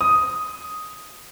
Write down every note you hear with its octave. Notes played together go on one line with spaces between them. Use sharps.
D#6